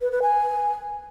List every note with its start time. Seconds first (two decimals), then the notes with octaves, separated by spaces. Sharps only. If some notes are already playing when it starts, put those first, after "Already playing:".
0.01 B4
0.12 B4
0.22 G#5